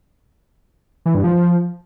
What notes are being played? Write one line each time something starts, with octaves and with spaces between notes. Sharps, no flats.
E3
G2
F3